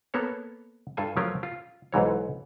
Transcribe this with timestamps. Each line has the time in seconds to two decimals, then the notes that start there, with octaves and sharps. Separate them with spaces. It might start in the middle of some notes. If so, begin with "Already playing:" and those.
0.14 A#3 B3 A4 C#5
0.97 G2 F4 A4 G#5
1.17 F3 F#3 A3 C#4 F4 A#4
1.43 F4
1.92 B1 G#2 E3 C#5